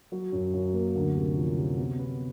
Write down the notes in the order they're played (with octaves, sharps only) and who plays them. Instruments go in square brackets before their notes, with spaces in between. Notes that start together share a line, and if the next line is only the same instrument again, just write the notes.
[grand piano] F#3
F#2
F#2
A#3
D2
C3
F3
C3
B3
B3